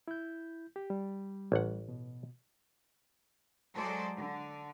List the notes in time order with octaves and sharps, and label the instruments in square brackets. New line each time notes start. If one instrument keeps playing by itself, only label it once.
[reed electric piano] E4 G6
G4
G3
[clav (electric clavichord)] A1 F#5
[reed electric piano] B2
[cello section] F#3 G#3 G#4 A4 C5 D5
D3